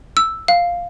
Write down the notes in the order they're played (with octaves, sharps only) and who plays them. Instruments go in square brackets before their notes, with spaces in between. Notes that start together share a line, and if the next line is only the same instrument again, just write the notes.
[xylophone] E6
F5